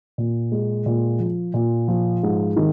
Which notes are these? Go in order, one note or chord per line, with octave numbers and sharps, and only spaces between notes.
A#2
G#3
A#2
F3
A#2
F3
G#2
D#3